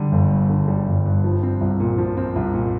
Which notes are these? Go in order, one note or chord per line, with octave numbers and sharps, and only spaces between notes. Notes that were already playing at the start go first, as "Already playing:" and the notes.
Already playing: D3 G3
G1
G2
D3
G3
G1
G2
F3
C4
C2
A#2
F3
C4
C2
A#2